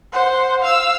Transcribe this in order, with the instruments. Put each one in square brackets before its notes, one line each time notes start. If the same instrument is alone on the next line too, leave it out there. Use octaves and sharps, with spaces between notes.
[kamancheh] C5 F#5
F5 E6